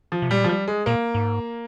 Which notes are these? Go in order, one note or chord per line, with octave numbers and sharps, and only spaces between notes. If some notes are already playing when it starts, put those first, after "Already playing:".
F3
C3
A#2 G3
F3
G3
G#3
A#2 A#3
G#2